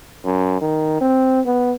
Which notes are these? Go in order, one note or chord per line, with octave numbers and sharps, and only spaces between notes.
F#2
D#3
C4
B3